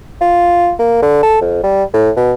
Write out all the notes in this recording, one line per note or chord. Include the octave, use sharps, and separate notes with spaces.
F4
A#3
D3
A4
F2
G3
A2
B2